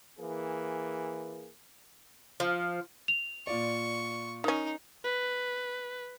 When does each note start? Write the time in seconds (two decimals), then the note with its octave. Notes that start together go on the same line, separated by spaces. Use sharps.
0.20 E3 A#3 G#4
2.40 F3
3.08 F7
3.47 A#2 F4 D5 C#6
4.44 D#3 C#4 D#4
5.04 B4